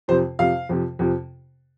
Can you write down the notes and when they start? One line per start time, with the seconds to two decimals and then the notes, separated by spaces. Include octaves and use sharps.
0.08 F2 C3 F3 C5
0.39 F2 C3 F3 F5
0.69 F2 C3 F3
0.99 F2 C3 F3